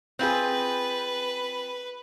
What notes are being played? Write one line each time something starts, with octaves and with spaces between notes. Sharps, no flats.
C4 F4 G#4 B4